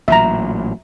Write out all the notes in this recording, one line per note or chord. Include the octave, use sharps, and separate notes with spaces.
A1 A#2 F#3 E5 A#5